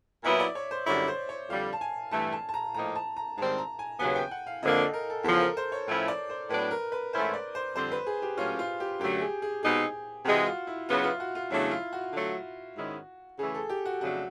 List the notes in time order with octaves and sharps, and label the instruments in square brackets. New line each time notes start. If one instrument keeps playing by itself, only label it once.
[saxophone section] A#2 F#3 B3 E4 [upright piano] E5
[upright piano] D5
C#5
C5
[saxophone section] F#2 D3 G3 C4 E4 [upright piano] C#5
[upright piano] C5
C#5
[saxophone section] F2 D3 G3 [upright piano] F5
[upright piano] A5
G#5
[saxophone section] G2 E3 A3 [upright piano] A5
[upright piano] A5
A5
A#5
[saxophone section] A2 F3 A#3 D#4 [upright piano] A#5
[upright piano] A5
A#5
[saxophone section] G#2 D#3 G3 C4 [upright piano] A5
[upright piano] A#5
G#5
[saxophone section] D#2 C#3 F#3 B3 [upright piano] G#5
[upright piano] G5
F#5
F5
[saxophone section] F2 D3 F3 A#3 D4 [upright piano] D#5
[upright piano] A4
A#4
A4
[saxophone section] E2 C#3 F3 [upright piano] A4
[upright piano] A#4
C5
C#5
[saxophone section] A2 F3 A3 C#4 E4
[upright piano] D5
C5
[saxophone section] A2 F#3 B3 D4 [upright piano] B4
[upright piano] A#4
B4
[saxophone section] G#2 E3 A3 C#4 E4 [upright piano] C5
[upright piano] D5
C5
[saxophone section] F2 D3 G3 C4 [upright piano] C5
[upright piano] B4
G#4
G4
[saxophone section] A2 F#3 A#3 C#4 [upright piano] F4
[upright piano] F4
G4
[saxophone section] F#2 D3 F#3 A3 [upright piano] G4
[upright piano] G#4
G#4
[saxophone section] B2 G#3 C4 D#4 [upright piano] G#4
[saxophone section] C3 E3 G#3 [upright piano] F#4
[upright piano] F4
E4
[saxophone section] C#3 F#3 B3 [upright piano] F4
[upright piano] F4
F#4
F4
[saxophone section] E2 C#3 F#3 A3 D4 [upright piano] E4
[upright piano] F4
F#4
[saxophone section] D3 F#3 A3
G#2 D#3 G#3 C#4 E4
[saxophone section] C#3 E3 A3 [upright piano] G#4
[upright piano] A4
G4
F#4
[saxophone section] F2 C#3 F#3 A3 D4 [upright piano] F#4